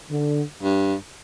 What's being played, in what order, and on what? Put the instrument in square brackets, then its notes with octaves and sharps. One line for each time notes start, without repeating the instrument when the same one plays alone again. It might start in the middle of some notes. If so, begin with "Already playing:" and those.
[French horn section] D3
[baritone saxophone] G2